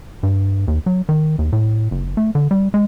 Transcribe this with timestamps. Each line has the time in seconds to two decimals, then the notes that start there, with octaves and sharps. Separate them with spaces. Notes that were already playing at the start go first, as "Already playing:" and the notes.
0.23 G2
0.68 D#2
0.86 F#3
1.09 D#3
1.39 D#2
1.53 A2
1.91 F#1
2.17 A3
2.35 D3
2.51 G3
2.74 G#3